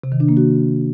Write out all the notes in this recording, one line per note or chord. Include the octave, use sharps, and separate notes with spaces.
C3
D#3
D4
A#3
F#4